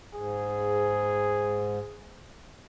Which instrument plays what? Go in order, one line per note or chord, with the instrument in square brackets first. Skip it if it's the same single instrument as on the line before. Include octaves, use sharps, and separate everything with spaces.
[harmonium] G#2 [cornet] G#4